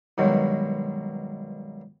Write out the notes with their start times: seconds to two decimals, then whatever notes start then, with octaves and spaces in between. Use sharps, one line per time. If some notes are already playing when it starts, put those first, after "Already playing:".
0.18 G2 B2 D#3 F#3 G#3